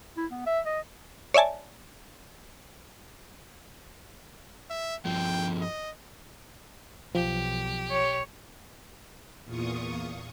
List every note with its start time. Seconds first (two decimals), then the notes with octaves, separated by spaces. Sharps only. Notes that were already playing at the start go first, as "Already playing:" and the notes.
0.17 E4
0.31 B3
0.46 E5
0.66 D#5
1.34 C#5 D5 E5 G#5 A5
4.70 E5
5.05 G2 F3 G5
5.61 D#5
7.15 B1 F3 G4
7.91 C#5
9.44 E2 A#2 F4 C#6 D#6